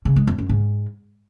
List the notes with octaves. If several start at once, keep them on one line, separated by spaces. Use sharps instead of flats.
C#3
G#3
F2
F#2
G#2